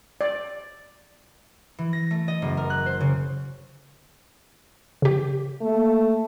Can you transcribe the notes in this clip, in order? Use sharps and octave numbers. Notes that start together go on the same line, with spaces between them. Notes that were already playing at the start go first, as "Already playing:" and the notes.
D5
E3
A#6
A3
D#5
F#1
A#4
F#6
C5
C#3
C#3 G4
A3 A#3